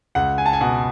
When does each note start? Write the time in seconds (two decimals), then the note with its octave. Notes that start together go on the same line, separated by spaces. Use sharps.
0.15 C#2 F#5
0.38 G#5
0.46 A5
0.53 G#5
0.61 B2 F#5